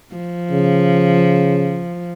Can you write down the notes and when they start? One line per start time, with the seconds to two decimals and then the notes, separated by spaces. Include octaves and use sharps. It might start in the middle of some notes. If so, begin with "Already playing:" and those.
0.15 F3
0.51 C#3